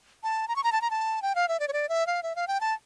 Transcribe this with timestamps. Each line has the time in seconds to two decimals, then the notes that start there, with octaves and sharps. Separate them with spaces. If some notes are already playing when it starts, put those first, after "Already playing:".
0.23 A5
0.48 A#5
0.56 C#6
0.64 A#5
0.72 A5
0.81 A#5
0.91 A5
1.22 G5
1.35 F5
1.48 E5
1.60 D5
1.68 C#5
1.73 D5
1.89 E5
2.07 F5
2.23 E5
2.36 F5
2.48 G5
2.61 A5